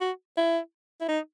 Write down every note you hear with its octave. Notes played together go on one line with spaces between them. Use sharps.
F#4
E4
E4
D#4